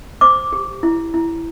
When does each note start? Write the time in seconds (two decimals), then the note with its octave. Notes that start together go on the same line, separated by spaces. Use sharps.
0.21 C5 D6
0.53 G4
0.83 E4
1.14 E4